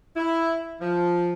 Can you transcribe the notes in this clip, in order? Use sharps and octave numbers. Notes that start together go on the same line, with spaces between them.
E4
F3